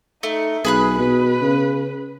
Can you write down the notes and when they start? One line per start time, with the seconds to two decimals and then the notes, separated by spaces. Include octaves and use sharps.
0.23 A3 D#4
0.65 B1 G#4 B4 B5 F#6
0.99 B2 B4
1.41 C#3